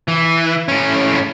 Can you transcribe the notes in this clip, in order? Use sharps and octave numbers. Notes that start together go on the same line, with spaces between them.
E3
A2 C#4